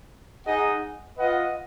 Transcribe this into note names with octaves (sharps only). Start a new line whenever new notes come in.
D#4 G#4 D#5 F#5
F4 B4 D#5 F#5